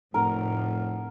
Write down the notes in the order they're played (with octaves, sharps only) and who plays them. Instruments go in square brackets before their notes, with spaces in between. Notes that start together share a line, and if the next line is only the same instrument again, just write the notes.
[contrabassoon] F1 [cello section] A2 [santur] A#4 [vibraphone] F#5 A#5